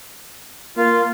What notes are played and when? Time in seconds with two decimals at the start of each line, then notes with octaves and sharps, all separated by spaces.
0.77 A#3 F4